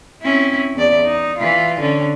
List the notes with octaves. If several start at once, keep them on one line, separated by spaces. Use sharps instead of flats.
C4 C#4 E4
E2 D5
D#4
E3 F4
D3 C#4